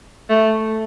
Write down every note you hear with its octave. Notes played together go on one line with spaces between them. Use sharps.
A3